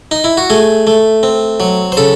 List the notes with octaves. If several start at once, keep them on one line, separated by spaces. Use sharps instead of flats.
D#4
E4
F#4
A3 G#4
A3
C4
F#3
C5
C#3 A4